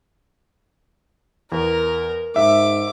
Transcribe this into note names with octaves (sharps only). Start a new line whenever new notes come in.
E2 A#4
G#2 E5 D6